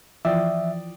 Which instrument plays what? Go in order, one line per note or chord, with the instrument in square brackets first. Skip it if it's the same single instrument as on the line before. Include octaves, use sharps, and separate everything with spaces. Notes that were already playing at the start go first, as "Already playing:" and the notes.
[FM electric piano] E3 F3 [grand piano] D5 G5 D#6 [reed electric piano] E5